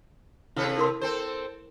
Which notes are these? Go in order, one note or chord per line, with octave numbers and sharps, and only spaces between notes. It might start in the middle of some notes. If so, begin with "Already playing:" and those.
C3 E4 A4 B4
E4 A#4 C6
C4 A4 C5